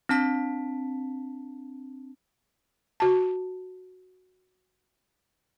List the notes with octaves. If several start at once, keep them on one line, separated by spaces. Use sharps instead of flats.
C4 D4 A5 B6
F#4 A5